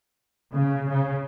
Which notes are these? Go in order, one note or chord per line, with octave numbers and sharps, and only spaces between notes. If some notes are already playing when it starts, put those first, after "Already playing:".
C#3
C#3